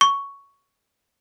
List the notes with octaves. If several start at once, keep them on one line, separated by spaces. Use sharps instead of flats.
C#6